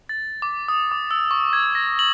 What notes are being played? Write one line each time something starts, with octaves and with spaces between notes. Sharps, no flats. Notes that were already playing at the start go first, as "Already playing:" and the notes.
A6
D6
D#6
D6
E6
C#6
G#6
A#6
F#7